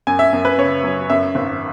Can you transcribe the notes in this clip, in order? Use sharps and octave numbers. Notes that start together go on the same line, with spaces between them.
F#2 G#5
E5
F#2
B4
C#3 C#5
F#3
F#2 E5
G#1